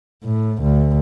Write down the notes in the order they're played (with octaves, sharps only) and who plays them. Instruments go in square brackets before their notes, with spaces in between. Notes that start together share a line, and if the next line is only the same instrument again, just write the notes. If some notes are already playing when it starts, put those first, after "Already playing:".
[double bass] A2
D2